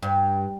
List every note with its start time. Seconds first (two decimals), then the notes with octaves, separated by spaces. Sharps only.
0.03 G2